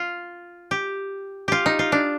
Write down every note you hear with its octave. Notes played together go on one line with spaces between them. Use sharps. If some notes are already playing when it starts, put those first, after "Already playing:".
Already playing: F4
G4
F4 G4
D#4
F4
D4